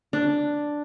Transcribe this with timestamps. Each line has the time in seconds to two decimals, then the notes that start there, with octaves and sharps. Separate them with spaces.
0.13 D4